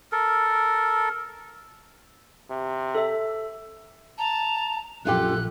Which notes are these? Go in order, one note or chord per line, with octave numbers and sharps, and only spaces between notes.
A4 A#4
C3
A4 E5
A5 A#5
A#1 F#2 F4 G4 A4 F#6